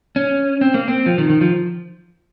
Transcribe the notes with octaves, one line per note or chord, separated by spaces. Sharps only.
C#4
C4
A#3
C4
F3
D#3
D#3
F3